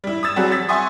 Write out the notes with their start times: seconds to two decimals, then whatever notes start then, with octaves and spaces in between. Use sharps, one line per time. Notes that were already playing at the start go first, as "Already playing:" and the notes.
0.04 G3 E4
0.23 D#6 E6 A6 E7
0.36 F#3 G3 C4 F#4 G#4
0.52 E6 A6 B6
0.69 E5 F#5 G#5 C6 C#6 D#6